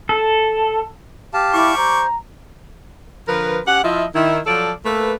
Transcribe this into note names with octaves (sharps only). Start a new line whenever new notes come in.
A4
G4 F5 A5
G3 E4 C#6 D6
C5 A#5
D3 F3 A#4 B4
C#4 G4 F#5
F3 E4 F4 D#5 E5
D#3 E4
F3 F#3 A4 D5
A3 A#3 A4 B4